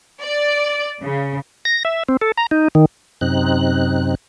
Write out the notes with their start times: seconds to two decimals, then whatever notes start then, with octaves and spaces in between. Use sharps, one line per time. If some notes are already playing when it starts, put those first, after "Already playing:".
0.20 D5
1.02 C#3
1.65 A#6
1.85 E5
2.09 C4
2.21 A4
2.37 A#5
2.51 D#4
2.75 D#3
3.21 F#2 C3 C4 D#4 F#6